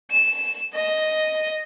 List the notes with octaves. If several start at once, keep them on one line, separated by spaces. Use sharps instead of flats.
E7
D#5